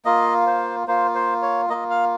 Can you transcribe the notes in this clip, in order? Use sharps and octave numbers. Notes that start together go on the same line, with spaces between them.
A#3 F4 D#5
C5
A#3 F4 C5
C5
C#5
A#3 F4 D#5
F5